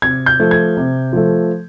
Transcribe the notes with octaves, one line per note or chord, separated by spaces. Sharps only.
C3 G#6
G6
F3 A3
G#6
C3
F3 A3